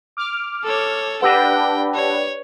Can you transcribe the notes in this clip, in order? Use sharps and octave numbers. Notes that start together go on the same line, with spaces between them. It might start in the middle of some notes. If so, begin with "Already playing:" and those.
D6 F6
A4 C#5
D4 G4 B4 F#5 G5 E6 A#6
C#5